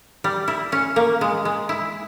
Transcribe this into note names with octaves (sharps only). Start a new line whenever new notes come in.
G3
E4
C#4
A#3
G#3
G#3
E4